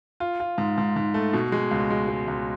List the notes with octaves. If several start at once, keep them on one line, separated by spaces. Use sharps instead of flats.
F4
F4
G#2
G#2
G#2
A3
B2
G#3
C#2
G#3
G#3
C#2